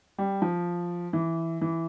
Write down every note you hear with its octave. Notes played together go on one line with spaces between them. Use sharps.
G3
F3
E3
E3